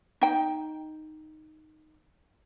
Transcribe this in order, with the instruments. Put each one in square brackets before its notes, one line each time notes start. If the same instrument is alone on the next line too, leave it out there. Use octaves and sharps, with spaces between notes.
[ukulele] D#4 G5